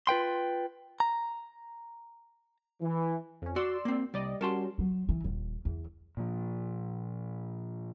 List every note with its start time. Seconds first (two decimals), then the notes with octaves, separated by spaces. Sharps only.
0.07 F4 B4 G5 C6
1.00 A#5
2.82 E3
3.42 F2 C#4
3.56 F#4 D5 C6 E6
3.85 A#3 C4
4.14 C2 G3 D5 D#5
4.41 G3 C#4 F#4 A#4 A5 C6
4.79 F#3
5.09 E3
5.24 D#1
5.65 E2
6.17 A#2 F3